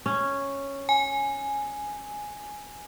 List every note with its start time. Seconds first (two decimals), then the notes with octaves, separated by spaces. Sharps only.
0.06 C#4
0.89 G#5